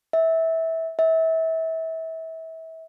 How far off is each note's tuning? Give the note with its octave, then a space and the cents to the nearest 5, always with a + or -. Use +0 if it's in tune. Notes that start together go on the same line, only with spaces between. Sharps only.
E5 -20
E5 -30